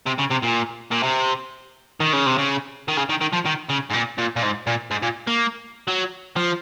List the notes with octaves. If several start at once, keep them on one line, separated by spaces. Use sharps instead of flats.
C3
C#3
C3
A#2
A#2
C3
D#3
C#3
C3
C#3
D#3
C#3
D#3
D#3
F3
D#3
C#3
G#2
A#2
A#2
A#2
G#2
A#2
G#2
A#2
A#3
F#3
F3